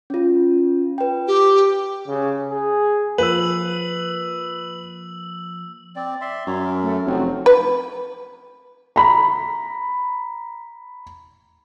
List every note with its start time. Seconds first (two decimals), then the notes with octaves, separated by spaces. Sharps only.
0.10 C#4 F4
0.98 B4 G5
1.28 G4
2.08 C#3
2.49 G#4
3.18 F3 A#3 B4 E6 F#7
5.96 C4 D5
6.21 D5 E5 C6
6.47 F#2 C#5
6.65 A#4
6.83 A3 A4
7.06 F1 F3 F#3 C4 F#4
7.46 B4
8.96 A#5 B5